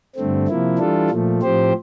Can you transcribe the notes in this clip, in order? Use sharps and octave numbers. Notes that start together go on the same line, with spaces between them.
G2 D3 A3 C4
C3 F3 A#3 E4
E3 G3 D4 F4 A4
A#2 F3 A3
A2 F3 C4 G4 C5